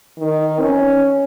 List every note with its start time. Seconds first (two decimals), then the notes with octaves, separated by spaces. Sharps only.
0.19 D#3
0.62 C#4